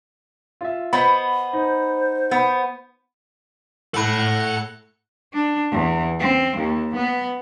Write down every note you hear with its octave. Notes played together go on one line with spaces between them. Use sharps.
F4 E5
B3 C5 D#5 B5
D#4 C5
B3
A2 A4 F#5 B5 C#7
D4
E2
C4
D#2
B3